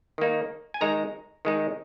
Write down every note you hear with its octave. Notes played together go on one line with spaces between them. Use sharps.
D#3 A#3 D#4
G#5
D#3 G#3 D#4 A#5
D#3 G#3 D#4